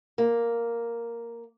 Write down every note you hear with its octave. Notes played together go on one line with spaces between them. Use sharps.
A#3